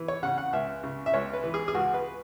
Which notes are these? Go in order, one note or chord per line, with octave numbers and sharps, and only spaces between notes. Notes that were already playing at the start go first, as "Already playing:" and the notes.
Already playing: E3
C#5
C#3 F#5
F#5
C#2 E5
C#3
E5
C#2 C#5
B4
E3
G#4
G#4
C#2 F#4
B4